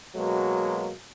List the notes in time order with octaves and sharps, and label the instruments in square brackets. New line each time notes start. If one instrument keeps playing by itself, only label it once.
[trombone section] B2 F#3 G#3 A#3